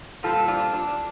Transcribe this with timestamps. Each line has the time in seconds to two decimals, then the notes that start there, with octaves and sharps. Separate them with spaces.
0.23 A#2 G3 C4 F4 A4
0.48 D4 F4
0.73 D4